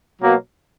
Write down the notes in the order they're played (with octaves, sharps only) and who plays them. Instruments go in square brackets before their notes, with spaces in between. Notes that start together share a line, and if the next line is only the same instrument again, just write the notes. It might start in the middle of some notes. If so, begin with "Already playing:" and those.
[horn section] B2 F#3 A#3